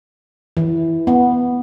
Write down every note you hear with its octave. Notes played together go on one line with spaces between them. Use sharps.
E3
B3